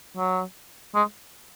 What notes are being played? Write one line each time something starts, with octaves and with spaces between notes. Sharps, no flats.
F#3
G#3